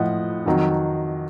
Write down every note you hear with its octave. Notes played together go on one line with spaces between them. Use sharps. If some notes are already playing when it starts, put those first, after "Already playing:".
Already playing: A2 F3 D#5 F#5
F2 D#3 F#3